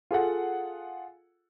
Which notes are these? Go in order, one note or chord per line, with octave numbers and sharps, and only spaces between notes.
F4 G#4 A4 F#5